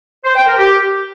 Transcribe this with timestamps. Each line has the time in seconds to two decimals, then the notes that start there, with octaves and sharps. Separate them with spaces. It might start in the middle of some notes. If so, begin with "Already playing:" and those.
0.25 C5
0.36 G5
0.47 A#4
0.58 G4